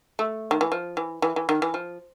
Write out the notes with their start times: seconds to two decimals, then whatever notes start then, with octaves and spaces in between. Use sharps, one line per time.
0.19 A3
0.51 D#3
0.61 E3
0.72 F3
0.97 E3
1.22 E3
1.36 E3
1.49 D#3
1.62 E3
1.74 F3